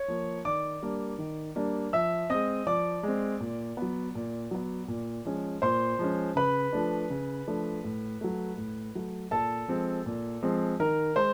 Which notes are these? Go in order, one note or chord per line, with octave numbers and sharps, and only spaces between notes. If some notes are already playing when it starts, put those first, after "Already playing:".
Already playing: C#5 C#6
F3 A#3
D#3 D5 D6
G3 A#3 D4
D#3
G3 A#3 D4
F3 E5 E6
G#3 C4 D#5 D#6
F3 D5 D6
G#3 C4
A#2
F#3 B3
A#2
F#3 B3
A#2
F3 G#3 C#4
A#2 C5 C6
F3 G#3 C#4
C#3 B4 B5
F3 A3 D4
C#3
F3 A3 D4
A2
F#3 A3
A2
F#3 A3
A#2 A4 A5
F3 G#3 C4
A#2
F3 G#3 C4
D#3 A#4 A#5
G#3 C5 C6